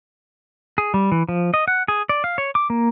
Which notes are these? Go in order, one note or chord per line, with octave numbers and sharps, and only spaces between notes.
G#4
G3
E3
F3
D#5
F#5
G#4
D5
F5
C#5
D6
A#3